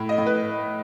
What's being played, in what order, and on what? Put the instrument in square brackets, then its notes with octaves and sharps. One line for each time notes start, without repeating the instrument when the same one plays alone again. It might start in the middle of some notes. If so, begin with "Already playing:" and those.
Already playing: [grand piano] A2
D#5
A2
B4